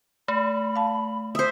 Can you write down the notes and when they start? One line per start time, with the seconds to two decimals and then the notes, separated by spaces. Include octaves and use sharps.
0.28 A3 B5
0.76 F5 A5
1.35 C5 E5 D#6